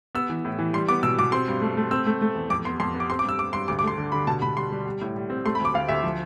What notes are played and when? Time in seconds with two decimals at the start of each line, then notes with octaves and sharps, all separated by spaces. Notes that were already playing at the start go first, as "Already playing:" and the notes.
0.15 B3 E6
0.29 E3
0.45 A2
0.59 E3
0.73 G3 C6
0.89 B3 D6
1.03 B2 E6
1.19 B2 D6
1.32 C4 C6
1.48 G2
1.62 A3
1.77 A3
1.91 C4 E6
2.06 A3
2.22 A3
2.35 E2
2.50 F2 D6
2.65 B3 C6
2.80 F2 C6
2.95 B3
3.00 D6
3.10 C4 C6
3.19 D6
3.24 G2 E6
3.39 G2 D6
3.53 G2 C6
3.68 D2 D6
3.79 D6
3.83 A3 C6
3.98 D3
4.12 D3 B5
4.27 B2 A5
4.42 B2 B5
4.57 G3 C6
4.71 G3
4.86 G3
5.01 A2
5.16 G3
5.30 C4
5.45 A3 C6
5.55 B5
5.60 D2
5.65 D6
5.74 D2 F5
5.88 D2 E5
6.03 F3